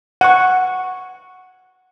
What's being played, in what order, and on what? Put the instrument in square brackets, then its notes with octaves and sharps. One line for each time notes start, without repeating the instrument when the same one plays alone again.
[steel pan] F#5 C#6